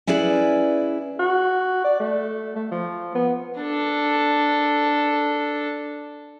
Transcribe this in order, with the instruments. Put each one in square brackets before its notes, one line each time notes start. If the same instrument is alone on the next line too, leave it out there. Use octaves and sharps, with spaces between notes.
[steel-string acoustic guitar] C#4 E4 G#4 B4 D5
[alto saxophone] F#4
D5
A3
A3
F3
B3
[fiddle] D4 A4